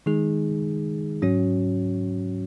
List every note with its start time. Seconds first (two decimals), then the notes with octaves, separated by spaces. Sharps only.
0.06 D#3 G#3 D#4 G#4
1.22 G#2 F#3 C#4 F#4 C#5